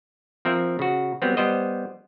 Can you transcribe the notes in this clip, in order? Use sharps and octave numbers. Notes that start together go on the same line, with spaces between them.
F3 C4 A#4 E5
C#3 F#4
F#3 G3 B3 C4
G3 B3 C5 D#5